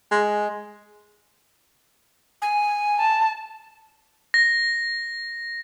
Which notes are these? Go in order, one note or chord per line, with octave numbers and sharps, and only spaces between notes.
G#3
G#5
A5
A#6